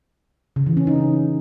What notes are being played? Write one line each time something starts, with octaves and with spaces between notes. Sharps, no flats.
C#3
E3
C#4
D#4